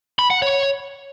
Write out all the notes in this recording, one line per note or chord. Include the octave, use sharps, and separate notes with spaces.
B5
F#5
C#5